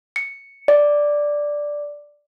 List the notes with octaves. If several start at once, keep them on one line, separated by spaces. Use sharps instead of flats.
C#7
D5